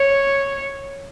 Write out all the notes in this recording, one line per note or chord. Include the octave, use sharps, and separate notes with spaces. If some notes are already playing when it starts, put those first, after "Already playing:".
Already playing: C#5